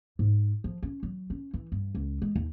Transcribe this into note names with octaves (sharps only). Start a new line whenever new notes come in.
G#2
F3
C#4
F#3
C#4
E3
G2
C#2
G#3
D#2